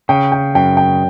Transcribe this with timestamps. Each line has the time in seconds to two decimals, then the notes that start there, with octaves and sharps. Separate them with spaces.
0.09 C#3 G5
0.32 G5
0.55 F#2 G5
0.77 G5